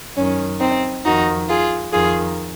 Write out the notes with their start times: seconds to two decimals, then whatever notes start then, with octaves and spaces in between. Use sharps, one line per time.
0.16 F#2 D#3 C#4
0.60 C4 D#4
1.05 F2 D#3 D#4 F#4
1.49 F4 G#4
1.93 F2 D#3 F4 G#4